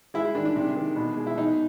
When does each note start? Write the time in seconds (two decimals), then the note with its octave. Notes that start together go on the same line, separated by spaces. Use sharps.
0.14 G#3 E4
0.25 E4
0.35 D#3 D4
0.45 D4
0.56 C3
0.76 D#3
0.96 B2
1.17 G#3
1.27 E4
1.37 B2 D#4